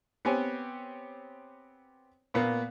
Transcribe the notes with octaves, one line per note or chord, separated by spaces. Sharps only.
B3 C4 G4 C#5 G#5
A#2 A#3 B3